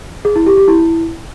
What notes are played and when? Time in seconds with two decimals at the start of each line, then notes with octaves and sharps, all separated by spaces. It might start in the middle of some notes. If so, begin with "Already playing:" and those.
0.25 G#4
0.36 E4
0.46 G4
0.57 G4
0.68 E4